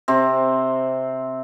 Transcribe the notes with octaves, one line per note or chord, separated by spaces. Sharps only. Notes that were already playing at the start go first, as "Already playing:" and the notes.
C3 C4